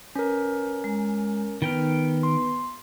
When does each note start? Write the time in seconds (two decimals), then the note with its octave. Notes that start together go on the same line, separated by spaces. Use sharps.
0.15 C#4 A#4 B4
0.84 G#3
1.62 D#3 B3 B4 G5 F6
2.23 C6